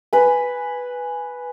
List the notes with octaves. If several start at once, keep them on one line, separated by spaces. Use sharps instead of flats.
B4 G#5